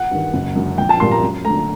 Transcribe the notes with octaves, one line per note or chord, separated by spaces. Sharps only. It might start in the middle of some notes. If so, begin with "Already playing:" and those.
Already playing: F#5
G2 D#3
F#1
F#2 D3
A#1 G5
A5
A#2 G3 A#3 C6
A#5
F#2
D3 A3 A#5